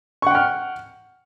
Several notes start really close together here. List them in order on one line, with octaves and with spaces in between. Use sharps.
C#6 F#5 G5 F6